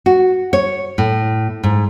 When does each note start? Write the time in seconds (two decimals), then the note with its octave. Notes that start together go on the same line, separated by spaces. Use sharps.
0.06 F#4
0.53 C#5
0.98 A2
1.63 G#2